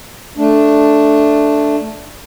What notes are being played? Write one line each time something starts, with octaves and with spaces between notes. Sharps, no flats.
A3 D4